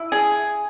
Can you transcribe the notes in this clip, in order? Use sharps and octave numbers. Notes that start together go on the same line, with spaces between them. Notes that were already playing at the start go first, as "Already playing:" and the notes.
Already playing: E4
G#4